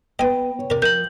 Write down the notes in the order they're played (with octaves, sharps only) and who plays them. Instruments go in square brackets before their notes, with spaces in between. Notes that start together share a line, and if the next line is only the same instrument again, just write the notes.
[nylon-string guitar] B3 B4 [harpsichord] D#5 G#5 [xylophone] G5
[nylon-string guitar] C#5
[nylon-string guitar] C3 [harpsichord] A#4 D5
[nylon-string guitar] F3 [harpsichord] A#4 [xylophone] G6 F#7